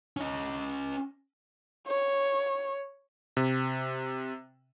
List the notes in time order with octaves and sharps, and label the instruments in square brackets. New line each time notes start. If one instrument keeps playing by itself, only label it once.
[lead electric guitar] C#4 D#5
[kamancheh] C#5
[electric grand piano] C3